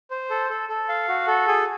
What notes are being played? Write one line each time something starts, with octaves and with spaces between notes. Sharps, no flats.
C5
A4
A4
A4
F5
F#4
A4
G#4